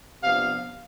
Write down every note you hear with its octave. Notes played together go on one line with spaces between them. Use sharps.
C3 F3 B3 D4 F5